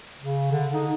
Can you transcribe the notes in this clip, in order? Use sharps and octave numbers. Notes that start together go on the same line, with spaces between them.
C#3
D3
D#4